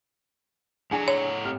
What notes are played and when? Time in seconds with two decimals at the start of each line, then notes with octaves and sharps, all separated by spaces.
0.91 A2 D4 G#4 F#5 G#5 A#5
1.08 C#5
1.44 G#1 G4 F6